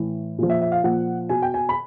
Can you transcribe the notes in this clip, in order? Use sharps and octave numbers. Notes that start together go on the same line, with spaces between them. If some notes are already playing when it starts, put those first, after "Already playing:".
Already playing: A2 E3
A#2 F3
E5
E5
F5
A#2 F3 F#5
B2 G#5
G5
G#5
B5